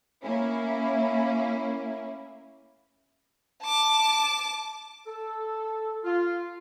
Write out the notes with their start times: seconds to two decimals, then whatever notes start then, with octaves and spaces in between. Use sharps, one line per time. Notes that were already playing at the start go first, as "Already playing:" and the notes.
0.24 A#3 C#4 E4
3.62 A5 D6
5.06 A4
6.04 F4